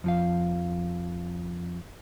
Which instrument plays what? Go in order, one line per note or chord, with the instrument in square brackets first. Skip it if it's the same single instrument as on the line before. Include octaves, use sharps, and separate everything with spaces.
[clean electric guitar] F2 F3 F5